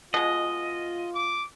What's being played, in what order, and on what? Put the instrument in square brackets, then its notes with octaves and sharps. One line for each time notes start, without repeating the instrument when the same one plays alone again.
[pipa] B2 G#3 [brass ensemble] F4 [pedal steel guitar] D#5
[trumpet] D6